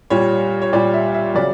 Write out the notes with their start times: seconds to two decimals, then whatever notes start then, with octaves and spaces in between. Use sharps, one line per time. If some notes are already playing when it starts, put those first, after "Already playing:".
0.10 A#2 G3 C#5
0.62 C#5
0.73 A#2 G3 D5
0.94 E5
1.14 E5
1.35 C#3 F#3 D5